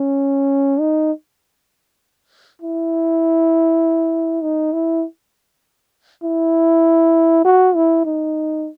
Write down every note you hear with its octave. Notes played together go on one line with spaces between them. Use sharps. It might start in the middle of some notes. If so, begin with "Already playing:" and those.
Already playing: C#4
D#4
E4
D#4
E4
E4
F#4
E4
D#4